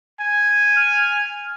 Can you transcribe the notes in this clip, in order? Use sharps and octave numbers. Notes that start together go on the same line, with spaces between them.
G#5
F6